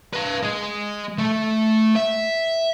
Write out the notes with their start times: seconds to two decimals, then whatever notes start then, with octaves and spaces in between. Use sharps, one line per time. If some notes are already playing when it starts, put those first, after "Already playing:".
0.13 B4 F5
0.42 G#3
1.19 A3
1.96 E5